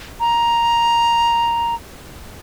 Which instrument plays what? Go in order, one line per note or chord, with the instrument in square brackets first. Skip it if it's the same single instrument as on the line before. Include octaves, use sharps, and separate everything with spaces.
[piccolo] A#5